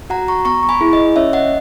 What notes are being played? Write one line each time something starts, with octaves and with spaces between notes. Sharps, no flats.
F#4 F#5 A#5
A#5 C#6
B3 A#5 C#6
C#6
G#5 B5
E4 G#4
D#5
C#4 C#5 E5
D#5 F#5